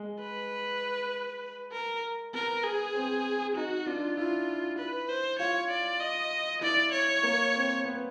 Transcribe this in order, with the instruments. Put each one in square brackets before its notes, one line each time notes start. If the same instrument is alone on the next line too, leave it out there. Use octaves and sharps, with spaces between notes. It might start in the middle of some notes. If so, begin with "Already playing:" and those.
Already playing: [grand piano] G#3
[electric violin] B4
A#4
[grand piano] B3 [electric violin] A#4
[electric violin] G#4
[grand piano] C4
[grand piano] D#4 [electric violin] F#4
[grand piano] D4 [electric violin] F4
[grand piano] E4 [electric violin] F4
[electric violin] B4
C5
[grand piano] F4 [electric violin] C#5
[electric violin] D5
D#5
[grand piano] E4 [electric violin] D5
[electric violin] C#5
[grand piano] A#3
C4
B3